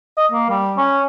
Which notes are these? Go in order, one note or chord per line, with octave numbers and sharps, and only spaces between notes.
D#5
A#3
G3
C#4